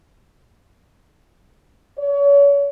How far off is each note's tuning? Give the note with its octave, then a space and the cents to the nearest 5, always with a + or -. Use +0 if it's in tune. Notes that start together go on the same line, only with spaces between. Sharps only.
C#5 +35